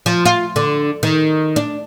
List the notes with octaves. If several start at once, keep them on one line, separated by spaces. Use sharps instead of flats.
F3
F4
D3
D#3
D4